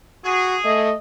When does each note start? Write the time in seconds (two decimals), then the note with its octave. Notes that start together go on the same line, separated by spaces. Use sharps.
0.25 F#4 G#4
0.65 A3 D#5